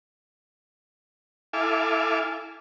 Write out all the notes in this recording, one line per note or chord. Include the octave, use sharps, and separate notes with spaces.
E4 A4 F5 G#5 D6